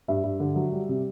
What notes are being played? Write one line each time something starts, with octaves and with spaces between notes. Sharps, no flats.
G2 E5
G2
D3
F#3
G3
C3